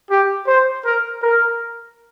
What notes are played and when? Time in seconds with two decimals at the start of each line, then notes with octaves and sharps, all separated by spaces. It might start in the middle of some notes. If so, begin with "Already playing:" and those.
0.10 G4
0.47 C5
0.86 A#4
1.22 A#4